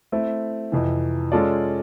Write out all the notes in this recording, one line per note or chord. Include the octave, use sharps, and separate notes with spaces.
A3 C4 E4
F2 C3 E3
G#3 C#4 F4 A4 D5